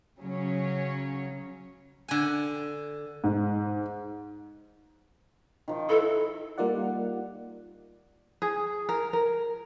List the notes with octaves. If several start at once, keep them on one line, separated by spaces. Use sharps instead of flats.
C#3 F#3 C#4 C#5
D3 G#5
G#2
D#3 F3
E4 A4 B4
G3 A#3 D#4 F4 D5 F#5
G#4
A#4
A#4